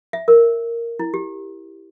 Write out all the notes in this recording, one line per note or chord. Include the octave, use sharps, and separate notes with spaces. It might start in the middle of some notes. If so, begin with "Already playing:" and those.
E5
A#4
E4
G4